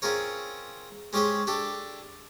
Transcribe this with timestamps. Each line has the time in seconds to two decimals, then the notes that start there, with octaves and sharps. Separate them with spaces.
0.02 C4 C#4 F4 G#4 A#4 C#5
1.13 G#3 C#4 G4 G#4 C5 C#5
1.47 D4 G4 A4